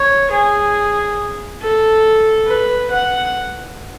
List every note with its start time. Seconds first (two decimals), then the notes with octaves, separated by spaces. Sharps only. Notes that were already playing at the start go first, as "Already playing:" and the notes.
Already playing: C#5
0.31 G#4
1.62 A4
2.47 B4
2.91 F#5